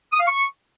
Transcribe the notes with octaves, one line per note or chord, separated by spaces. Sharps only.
D#6
F5
C#6